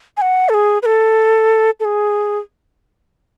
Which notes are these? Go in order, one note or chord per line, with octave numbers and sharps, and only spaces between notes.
G#5
F#5
A4
G#4
B4
A4
A4
G#4